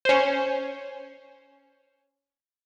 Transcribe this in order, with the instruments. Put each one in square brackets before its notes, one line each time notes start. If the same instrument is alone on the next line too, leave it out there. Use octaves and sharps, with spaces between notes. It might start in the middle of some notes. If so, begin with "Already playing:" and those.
[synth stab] C#4 C5